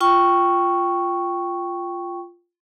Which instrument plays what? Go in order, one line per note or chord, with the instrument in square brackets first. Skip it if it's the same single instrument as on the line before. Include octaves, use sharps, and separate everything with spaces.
[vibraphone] F4 G5 C#6